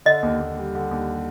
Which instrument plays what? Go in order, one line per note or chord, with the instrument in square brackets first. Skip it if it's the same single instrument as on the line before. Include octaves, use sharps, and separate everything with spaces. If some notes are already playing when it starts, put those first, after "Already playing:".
[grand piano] D3 [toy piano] D#5
[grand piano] D#2
D#2
G3
D3
D#2